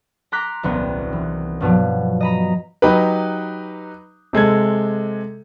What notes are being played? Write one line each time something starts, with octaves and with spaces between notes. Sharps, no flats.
A#5 C6 D6 F#6 A#6 B6
D#1 C2 B3
E3
G2 B2 F3 F#3
D#5 A#5 B5
F#3 D#4 G4 B4
C3 G#3 A4 G#6